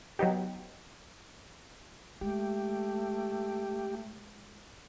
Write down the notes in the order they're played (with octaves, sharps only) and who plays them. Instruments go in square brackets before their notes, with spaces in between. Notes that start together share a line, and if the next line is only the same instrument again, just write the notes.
[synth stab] F#3 B3 D#4 G4
[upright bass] G#3 [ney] A3 [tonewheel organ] G4